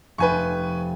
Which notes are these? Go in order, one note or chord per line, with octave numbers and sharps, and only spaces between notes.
F1 B4 G5 G#5 C#6